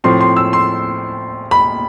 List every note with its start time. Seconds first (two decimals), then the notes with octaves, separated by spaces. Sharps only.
0.04 A2 F3 C4 C6
0.21 C6
0.36 E6
0.53 C6
1.51 B5